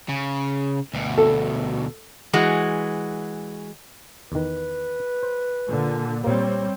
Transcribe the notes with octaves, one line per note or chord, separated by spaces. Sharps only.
C#3
D2 B2
A4
E3 G#3 F#4
E2 D#3 B4
C5
A#2 D3
A#2 G3 A#3 C4 C#5